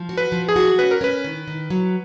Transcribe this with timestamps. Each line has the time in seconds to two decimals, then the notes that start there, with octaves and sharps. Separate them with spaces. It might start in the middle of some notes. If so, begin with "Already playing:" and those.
Already playing: F3
0.09 F#4
0.17 B4
0.32 F3
0.49 G#4
0.56 F#4
0.79 C#4 B4
0.91 A#4
1.01 C#4 B4
1.24 D#3
1.48 D#3
1.70 F#3